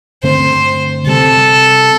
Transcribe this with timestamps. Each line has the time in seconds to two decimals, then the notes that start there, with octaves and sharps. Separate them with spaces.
0.23 G2 D3 A3 C4 C5
1.06 C3 G3 C4 A4